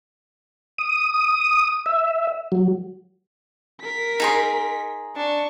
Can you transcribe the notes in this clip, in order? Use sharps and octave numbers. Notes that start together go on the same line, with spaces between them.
D#6
E5
F#3
A#4 B6
D#4 G#4 C6
D4 C#6